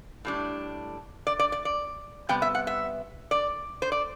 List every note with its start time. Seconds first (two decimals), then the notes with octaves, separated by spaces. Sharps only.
0.25 A2 G3 D4
1.27 D5
1.39 D5
1.52 D5
1.65 D5
2.29 C3 G3 B3 G5
2.42 E5
2.55 F#5
2.67 E5
3.31 D5
3.82 C5
3.92 D5